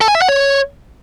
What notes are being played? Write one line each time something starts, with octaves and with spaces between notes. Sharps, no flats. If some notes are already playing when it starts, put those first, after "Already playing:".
A4
G#5
E5
F#5
C#5